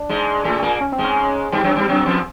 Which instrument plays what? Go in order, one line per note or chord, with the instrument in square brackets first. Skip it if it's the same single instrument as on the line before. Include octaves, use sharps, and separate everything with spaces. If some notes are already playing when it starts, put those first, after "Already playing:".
Already playing: [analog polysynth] D4
[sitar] G#2 G#3
A2 A3
A#2 A#3
[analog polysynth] C#4
C4
[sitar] G#2 G#3
[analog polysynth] C#4
[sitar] G2 G3 [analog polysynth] C4
[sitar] F#2 F#3
G2 G3
F#2 F#3
F2 F3